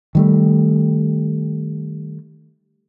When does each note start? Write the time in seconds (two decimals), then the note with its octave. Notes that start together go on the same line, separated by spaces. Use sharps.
0.15 D#3 G3 A3